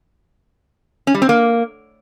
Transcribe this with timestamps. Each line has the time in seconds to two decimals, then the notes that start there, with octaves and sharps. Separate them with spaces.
1.07 C#4
1.14 G3
1.22 C4
1.29 A#3